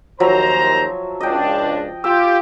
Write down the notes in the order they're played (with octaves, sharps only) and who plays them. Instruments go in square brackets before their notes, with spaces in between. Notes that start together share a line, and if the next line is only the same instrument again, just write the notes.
[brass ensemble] D#2 C5 A#5 [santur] F3 F#3 E5
[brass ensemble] C#2 D4 [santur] D#5 G5
[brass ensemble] F4 G4 [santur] E6